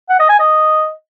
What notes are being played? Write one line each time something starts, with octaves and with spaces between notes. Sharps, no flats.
F#5
D#5
G#5
D#5